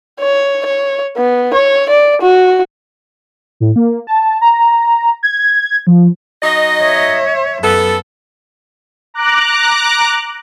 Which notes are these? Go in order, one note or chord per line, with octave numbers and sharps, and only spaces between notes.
C#5
C#5
B3
C#5
D5
F#4
A2
A#3
A5
A#5
G#6
F3
F#3 D#4 D#5
C#5 E5
F#2 B3 A4
A#5 D6 F#6